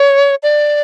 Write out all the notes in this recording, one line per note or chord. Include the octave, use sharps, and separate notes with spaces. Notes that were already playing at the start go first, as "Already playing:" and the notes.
Already playing: C#5
D5